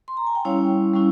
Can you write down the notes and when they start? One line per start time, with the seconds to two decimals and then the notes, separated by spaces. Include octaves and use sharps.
0.08 C6
0.17 A#5
0.27 G#5
0.35 G5
0.45 G3 C#4 E4 C#5 F5
0.93 G3 C#4 E4